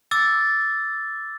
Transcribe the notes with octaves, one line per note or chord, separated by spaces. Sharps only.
D6 E6 A6